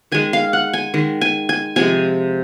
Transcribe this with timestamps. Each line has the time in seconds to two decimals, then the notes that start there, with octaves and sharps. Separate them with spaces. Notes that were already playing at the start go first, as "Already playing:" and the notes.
0.12 D#3 G#3 G#5
0.33 F5
0.53 F#5
0.73 G#5
0.94 D#3 G#3
1.21 G#5
1.49 G#5
1.76 C3 F3 G#3 G#5